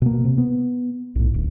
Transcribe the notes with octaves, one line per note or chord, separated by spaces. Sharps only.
B2 A#3
C3
B3
B1 A2
D1